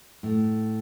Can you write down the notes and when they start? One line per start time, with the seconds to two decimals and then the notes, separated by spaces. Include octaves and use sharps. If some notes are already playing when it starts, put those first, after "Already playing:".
0.23 A2